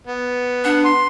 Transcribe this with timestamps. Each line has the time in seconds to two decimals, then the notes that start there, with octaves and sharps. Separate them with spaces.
0.07 B3
0.64 D4 F#5
0.85 C6